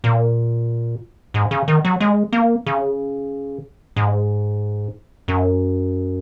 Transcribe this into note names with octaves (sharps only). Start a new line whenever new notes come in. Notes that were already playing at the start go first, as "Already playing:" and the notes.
A#2
G#2
C#3
D#3
F#3
G#3
A#3
C#3
G#2
F#2